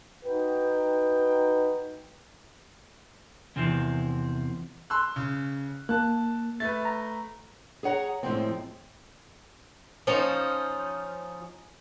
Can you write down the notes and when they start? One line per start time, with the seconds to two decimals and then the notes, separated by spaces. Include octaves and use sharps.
0.25 D#4 F#4 B4 G5
3.56 E2 C3 F3 C4 E4
4.90 C6 E6 F#6
5.16 C#3
5.89 A#3 A5 F#6
6.60 A3 B4 A6
6.85 A#5
7.83 G#4 C#5 F#5 A#5
8.23 F#2 A2 F3 G#3 C4
10.07 F3 C#4 D#4